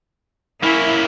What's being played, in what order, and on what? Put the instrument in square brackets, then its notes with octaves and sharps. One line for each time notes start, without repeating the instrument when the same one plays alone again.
[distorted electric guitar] A#3 C#4 [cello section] E4